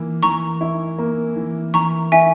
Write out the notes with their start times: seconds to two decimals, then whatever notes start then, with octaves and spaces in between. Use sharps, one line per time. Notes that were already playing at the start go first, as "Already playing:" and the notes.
Already playing: E3 A#3
0.23 E3 A#5 C#6
0.61 E4
0.98 A#3
1.36 E3
1.74 E3 A#5 C#6
2.12 E4 E5 G#5